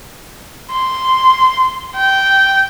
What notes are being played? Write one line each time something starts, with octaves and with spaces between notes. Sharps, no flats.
C6
G5